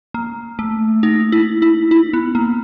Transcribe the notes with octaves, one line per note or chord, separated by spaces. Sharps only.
A#3
A3
D#4
E4
E4
E4
B3
A#3